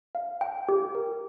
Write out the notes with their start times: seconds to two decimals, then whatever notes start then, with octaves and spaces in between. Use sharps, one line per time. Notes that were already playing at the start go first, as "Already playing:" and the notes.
0.15 F5
0.41 G5
0.69 G4
0.95 A#4